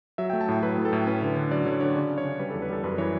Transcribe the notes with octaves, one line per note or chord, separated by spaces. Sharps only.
F#3 E5
A3 G5
A5
A2 G5
F#3 B4
A2
A4
A2
C#4 B4
D3 B4
D3
F#3 D5
D3 C#5
D3 C#5
C#3 D5
C#4
C#5
C#3
G3 B4
E2 A4
B4
G3 A4
F#2 B4
E3 C#5